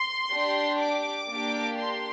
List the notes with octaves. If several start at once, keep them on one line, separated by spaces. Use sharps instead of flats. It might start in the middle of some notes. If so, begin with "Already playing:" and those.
Already playing: C6
D4 G4
D6
A#3 D4 G4
C6